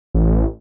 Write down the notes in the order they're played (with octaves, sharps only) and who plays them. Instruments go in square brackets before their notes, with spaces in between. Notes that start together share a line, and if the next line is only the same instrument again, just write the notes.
[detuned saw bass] A1